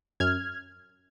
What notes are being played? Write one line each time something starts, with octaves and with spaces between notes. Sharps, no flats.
F#2 F6 G#6